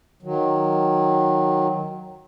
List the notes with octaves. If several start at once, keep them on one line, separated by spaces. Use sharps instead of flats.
D#3 F#3